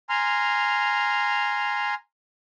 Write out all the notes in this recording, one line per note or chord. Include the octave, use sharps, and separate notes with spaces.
G#5 A#5 C6 F6